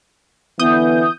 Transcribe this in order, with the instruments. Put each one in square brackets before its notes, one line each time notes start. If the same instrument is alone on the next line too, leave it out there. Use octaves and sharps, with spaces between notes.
[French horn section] D3 E3 B3 [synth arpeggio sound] D#6 G6